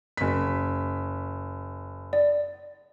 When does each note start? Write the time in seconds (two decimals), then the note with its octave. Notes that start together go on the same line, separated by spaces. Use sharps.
0.17 F#1 B6
2.13 D5